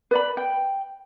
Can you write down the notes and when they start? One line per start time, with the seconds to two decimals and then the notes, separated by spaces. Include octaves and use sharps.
0.11 B4 D5 B5
0.37 G5